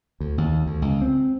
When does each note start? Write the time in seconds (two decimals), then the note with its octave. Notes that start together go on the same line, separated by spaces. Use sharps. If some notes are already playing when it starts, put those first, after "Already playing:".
0.20 D2
0.38 D#2
0.66 D2
0.82 C#2
1.01 C4